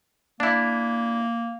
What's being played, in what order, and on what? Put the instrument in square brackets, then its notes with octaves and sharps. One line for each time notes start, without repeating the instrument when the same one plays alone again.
[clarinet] A#3 [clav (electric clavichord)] D4 E4